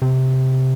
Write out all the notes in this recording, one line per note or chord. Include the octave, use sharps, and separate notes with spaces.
C3